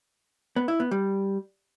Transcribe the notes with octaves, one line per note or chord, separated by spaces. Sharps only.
B3
E4
B3
G3